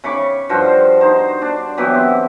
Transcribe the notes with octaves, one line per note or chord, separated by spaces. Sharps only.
C#3 B5 C#6 D6
G2 F3 F#4 C5
D#4 C5
D4
E3 F#3 B3 G4
C4